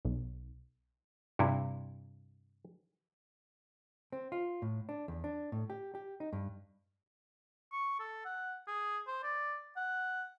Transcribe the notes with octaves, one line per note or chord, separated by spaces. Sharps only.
B1
G2 C3 E4
C4
F4
A2
D4
E2
D4
A2
G4
G4
D#4
G2
C#6
A4
F#5
G#4
C5
D5
F#5